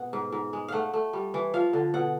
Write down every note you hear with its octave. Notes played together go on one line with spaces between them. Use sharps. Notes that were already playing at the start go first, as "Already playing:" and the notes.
Already playing: B2 G#3 F#5
G#2
G#2
G#3
A3 F5 F#5
A3
G3
E3
F3 F5
D3
B2 F#5